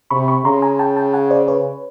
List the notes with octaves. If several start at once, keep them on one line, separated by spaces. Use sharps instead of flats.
C3 B5 C#6
B5 C#6
C#3 A#5 C6
G#5 A#5
G5 A5
G5 A5
F#5 G#5
C5 D5
B4 C#5